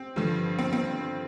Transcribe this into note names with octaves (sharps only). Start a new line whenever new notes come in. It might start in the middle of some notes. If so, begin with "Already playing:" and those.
Already playing: C4
G2 D3 F3
C4
C4